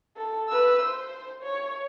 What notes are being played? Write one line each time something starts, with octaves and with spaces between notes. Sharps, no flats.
A4
B4 E6
C5
C#5